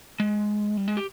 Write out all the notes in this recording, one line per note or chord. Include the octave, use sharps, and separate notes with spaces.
G#3
G3
G#3
G4